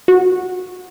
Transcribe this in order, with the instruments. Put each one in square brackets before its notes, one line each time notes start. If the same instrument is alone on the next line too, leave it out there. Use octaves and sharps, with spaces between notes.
[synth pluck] F#4